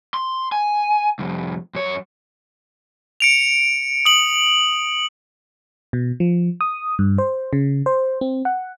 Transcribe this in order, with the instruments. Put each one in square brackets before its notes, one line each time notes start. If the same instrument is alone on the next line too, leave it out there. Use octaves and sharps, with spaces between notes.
[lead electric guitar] C6
G#5
C2 F2
F#2 C#5
[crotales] C#7 D7 F7
D#6 F#7
[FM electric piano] B2
F3
D#6
G2
C5
C#3
C5
C4
F#5